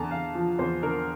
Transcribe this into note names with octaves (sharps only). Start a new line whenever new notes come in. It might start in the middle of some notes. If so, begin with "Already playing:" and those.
Already playing: E2 D3 A5 A#5
E2 F5
F3
E2 C5
D3 A#4